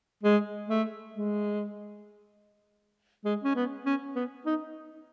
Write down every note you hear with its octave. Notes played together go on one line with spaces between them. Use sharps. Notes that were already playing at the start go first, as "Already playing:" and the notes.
G#3
A3
G#3
G#3
C#4
B3
C#4
B3
D#4